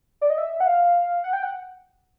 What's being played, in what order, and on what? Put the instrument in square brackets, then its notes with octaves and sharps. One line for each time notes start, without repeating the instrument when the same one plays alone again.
[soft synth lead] D5
D#5
E5
F#5
F5
F#5
G5
F#5